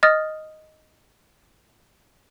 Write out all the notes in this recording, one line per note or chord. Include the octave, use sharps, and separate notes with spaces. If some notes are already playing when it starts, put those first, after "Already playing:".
D#5 D#6 F6 A6